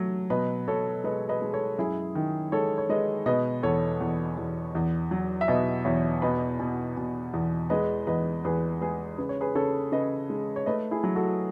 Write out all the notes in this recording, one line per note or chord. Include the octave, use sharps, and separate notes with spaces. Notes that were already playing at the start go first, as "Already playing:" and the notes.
Already playing: F#3 A3
B2 B4 D#5
B2 A4 C#5
G#3 B4 D#5
B4 D#5
G#3
A4 C#5
F#2 E4 G#4
D#3
G#3 A4 C#5
C#5
G#3 B4 D#5
B2 B4 D#5
E2 A4 C#5
E2
E2
E2
F#3
E5
B2 B4 D#5
E2 C#5 E5
B2 B4 D#5
B2
B2
E2
G#3 B4 D#5
E2 B4 D#5
E2 G#4 B4
G#3 G#4 B4
C#3 B4
C#5
G#4 B4
C#3 A4 C#5
C#3 B4 D#5
G#3
C#5
A3 B4 D#5
E4 G#4
F#3
F#4 A4